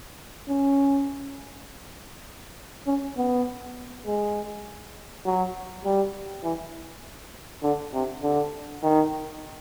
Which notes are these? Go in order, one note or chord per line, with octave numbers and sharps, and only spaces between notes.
C#4
C#4
B3
G#3
F#3
G3
E3
D3
C3
D3
D#3